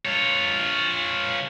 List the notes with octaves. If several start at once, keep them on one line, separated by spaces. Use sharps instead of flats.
F4 C#5